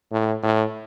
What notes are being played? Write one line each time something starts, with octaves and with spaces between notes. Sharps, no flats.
A2
A2